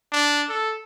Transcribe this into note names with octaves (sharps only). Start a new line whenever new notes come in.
D4
A4